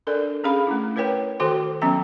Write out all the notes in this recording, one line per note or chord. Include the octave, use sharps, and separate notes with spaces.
D4 A4 A#4 D5
C#4 G#4 F5 B5
A3 C#4 E4
E4 A#4 B4 C#5 G5
D#3 F#4 A4 C5 G5 C6
D#3 F#3 B3 C#4 G5 A#5